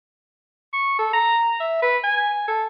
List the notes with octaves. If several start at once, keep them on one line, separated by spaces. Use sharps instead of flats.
C#6
A4
A#5
E5
B4
G#5
A4